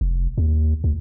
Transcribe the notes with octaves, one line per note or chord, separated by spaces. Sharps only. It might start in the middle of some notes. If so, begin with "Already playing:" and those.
F1
D#2
D2